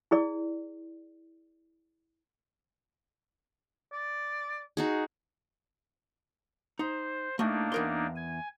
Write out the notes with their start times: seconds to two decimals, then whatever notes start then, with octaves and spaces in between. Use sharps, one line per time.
0.11 E4 G#4 D5
3.93 D5
4.77 D#4 F#4 G#4
6.79 D#4 C5
7.39 A2 A3 A#3 D4 D#4
7.72 E2 A#4 C6
8.16 G#5